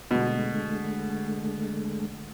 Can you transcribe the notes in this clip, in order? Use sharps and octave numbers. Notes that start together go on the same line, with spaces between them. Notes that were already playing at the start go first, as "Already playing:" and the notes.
B2 D3 G#3 A3